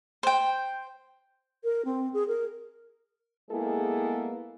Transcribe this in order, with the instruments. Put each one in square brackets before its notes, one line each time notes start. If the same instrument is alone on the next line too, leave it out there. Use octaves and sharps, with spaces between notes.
[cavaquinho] C5 G5
[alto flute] A#4
C4
G#4
A#4
[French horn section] G#3 A#3 B3 E4 G#4 A4